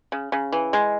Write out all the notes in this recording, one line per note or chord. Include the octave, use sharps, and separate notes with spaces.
C#3
C#3
E3
G#3